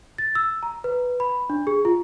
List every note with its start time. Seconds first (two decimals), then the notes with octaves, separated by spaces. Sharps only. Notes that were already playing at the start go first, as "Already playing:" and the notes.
0.18 A6
0.35 E6
0.63 A#5
0.84 B4
1.20 B5
1.50 D4
1.67 G#4
1.85 F4